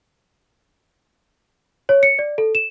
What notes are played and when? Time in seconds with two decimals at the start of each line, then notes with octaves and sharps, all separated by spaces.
1.89 C#5
2.03 C#7
2.19 D5
2.38 A4
2.55 E7